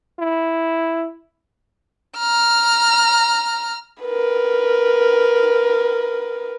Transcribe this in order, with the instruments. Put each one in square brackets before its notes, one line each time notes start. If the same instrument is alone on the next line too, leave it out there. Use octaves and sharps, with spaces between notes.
[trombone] E4
[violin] A#5 F6
[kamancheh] A#4 B4